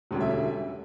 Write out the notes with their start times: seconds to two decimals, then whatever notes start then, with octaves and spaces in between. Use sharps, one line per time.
0.11 E1 D2 C#3 G3
0.21 E5
0.31 E5